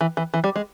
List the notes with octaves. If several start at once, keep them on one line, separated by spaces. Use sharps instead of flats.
E3
E3
E3
G3
G#3